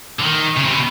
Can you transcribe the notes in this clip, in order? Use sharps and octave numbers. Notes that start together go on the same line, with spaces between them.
D3
D#3
C#3
C3
B2